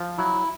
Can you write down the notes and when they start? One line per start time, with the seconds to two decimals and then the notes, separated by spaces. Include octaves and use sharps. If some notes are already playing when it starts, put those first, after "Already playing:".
Already playing: F3
0.18 F#3 E4